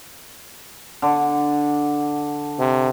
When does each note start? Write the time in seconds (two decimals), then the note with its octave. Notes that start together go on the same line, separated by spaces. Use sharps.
1.02 D3
2.59 C3